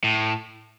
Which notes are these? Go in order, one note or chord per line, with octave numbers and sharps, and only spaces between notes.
A2